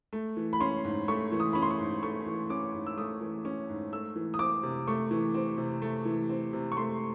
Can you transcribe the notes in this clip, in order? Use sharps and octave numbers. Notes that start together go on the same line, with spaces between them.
A3
E3
B5
C#4 C6
G#2
A3 C#6
E3
D#6
C#4 B5
C6
C#6
G#2
A3 C#6
E3
C#4 D6
G#2
E6
A3 D#6
E3
C#4
G#2
A3 E6
E3
D#6
C4 D6
C3
A3 C#6
E3
C4
C3
A3
E3
C4
C3
C#6
A3 C6